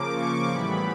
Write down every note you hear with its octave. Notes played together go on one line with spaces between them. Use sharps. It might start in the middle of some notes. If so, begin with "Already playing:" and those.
Already playing: C#3 F3 A#3 D6
C#6
A2 E3 G3 B3 B5